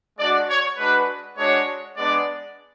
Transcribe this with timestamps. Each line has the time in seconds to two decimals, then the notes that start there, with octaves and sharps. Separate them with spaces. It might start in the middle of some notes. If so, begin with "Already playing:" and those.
0.18 G#3 D4 F#4 D5
0.48 C#5
0.77 G#3 D4 F#4 B4
1.37 G#3 D4 F#4 C#5
1.96 G#3 B3 D4 D5